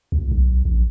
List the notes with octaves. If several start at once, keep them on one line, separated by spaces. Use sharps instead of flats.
C#2
B1
A#1